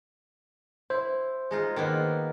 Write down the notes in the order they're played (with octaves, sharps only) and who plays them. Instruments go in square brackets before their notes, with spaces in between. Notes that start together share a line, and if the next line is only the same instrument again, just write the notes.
[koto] E4 [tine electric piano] C5
[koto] G#3 D#4 F4
D#3 A#3 B3